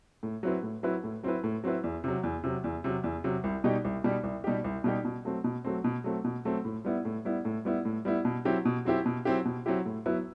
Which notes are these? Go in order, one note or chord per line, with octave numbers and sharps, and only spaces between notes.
A2
F#3 C4 E4 B4
A2
F#3 C4 E4 B4
A2
F#3 C4 E4 B4
A2
F#3 C4 E4 B4
E2
C3 F#3
E2
C3 F#3
E2
C3 F#3
E2
C3 F#3
C2
B2 G3 D#4 G4
C2
B2 G3 D#4 G4
C2
B2 G3 D#4 G4
C2
B2 G3 D#4 G4
B2
F#3 A3 C4
B2
F#3 A3 C4
B2
F#3 A3 C4
B2
F#3 A3 C4
A2
G3 B3 E4
A2
G3 B3 E4
A2
G3 B3 E4
A2
G3 B3 E4
B2
F#3 C4 E4 G4
B2
F#3 C4 E4 G4
B2
F#3 C4 E4 G4
B2
F#3 C4 E4 G4
A2
F#3 B3 E4 B4